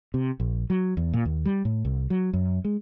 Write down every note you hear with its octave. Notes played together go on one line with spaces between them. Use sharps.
C3
A#1
F#3
E2
A#2
D#2
G3
A2
C2
F#3
F#2
G#3